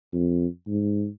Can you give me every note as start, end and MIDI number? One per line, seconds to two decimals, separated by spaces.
0.13 0.46 41
0.67 1.07 44